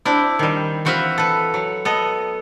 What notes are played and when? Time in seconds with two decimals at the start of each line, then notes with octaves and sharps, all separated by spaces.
0.05 C4 D4 E4
0.39 D#3 G3
0.85 E3 C4 F#4 B4 E5 F5
1.18 A4 B4
1.54 F#3
1.85 B3 A4 D#5